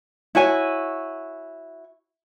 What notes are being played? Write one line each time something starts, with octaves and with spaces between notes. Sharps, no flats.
E4 F#4 C#5 G#5